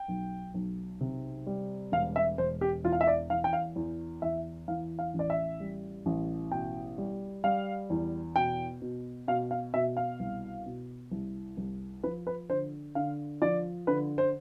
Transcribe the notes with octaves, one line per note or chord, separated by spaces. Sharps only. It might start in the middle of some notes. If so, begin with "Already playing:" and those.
Already playing: G5
B1
B1
C3
G3
E1 F5
E5
E1 C5
G4
E2 F4
F5
E5
D5
E3 F5
G5
F5
E2
E2 E5
E3 F5
F5
A1
D5
E5
G3
A1
B2 G5
G3
G3 F5
E2
B2 G5
B2
B2 F5
F5
B2 E5
F5
C2
B2
C2
C2
F3 B4
B4
D3 C5
D3 F5
F3 D5
D3 B4
C5